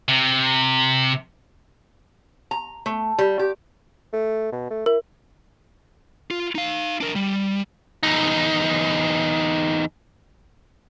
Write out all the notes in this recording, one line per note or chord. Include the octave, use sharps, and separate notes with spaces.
C3
A#5
A3
G3
G4
A3
B2
A3
E4 A#4
F4
D#4 F5
D4 A#4
G3
E2 D#4